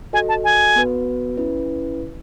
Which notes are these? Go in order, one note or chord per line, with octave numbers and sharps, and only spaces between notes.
F#4 A4 D#5 G#5
A5
G#5
B3 F#4 B4
C#4 E4 B4